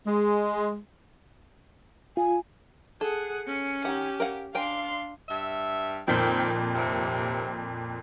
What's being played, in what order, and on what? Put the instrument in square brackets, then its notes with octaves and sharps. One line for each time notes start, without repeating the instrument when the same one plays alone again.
[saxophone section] G#3
[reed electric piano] F4 [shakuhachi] G#5
[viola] G#4 F#5 [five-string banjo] A4
[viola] C#4 [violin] C#7
[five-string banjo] D#3 F#5 [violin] G4
[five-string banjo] A#4 F5 F#5
[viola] D4 [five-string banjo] A#4 G5 G#5 [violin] F5 C6
[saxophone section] G2 E5
[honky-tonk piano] F2 A#2 [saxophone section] D#3 C4
[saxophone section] D#2 C3